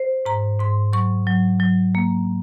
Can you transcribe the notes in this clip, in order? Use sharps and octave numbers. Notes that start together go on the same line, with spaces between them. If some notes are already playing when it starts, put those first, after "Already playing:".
Already playing: C5
G#2 A#5
G#2 C6
F#3 C#6
F#3
F#3
A#3